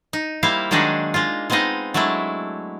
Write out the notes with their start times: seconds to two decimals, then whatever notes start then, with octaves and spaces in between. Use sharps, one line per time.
0.13 D#4
0.43 G3 A#3 E4 C5 F5
0.71 D#3 F#3 G#3 D4 D#4 G#4
1.14 G#3 A#3 F4
1.50 G#3 B3 C4 D#4 D#5 F5
1.94 F#3 G#3 A3 D4 E4